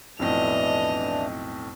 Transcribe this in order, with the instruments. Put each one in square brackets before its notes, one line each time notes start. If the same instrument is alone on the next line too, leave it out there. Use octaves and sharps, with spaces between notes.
[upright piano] B1 F2 A2 [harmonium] E3 D4 [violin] D#5 F7